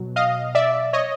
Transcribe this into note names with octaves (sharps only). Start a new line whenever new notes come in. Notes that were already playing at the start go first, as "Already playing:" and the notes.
Already playing: B2 F#3
D#5 F5
D5 E5
C#5 D#5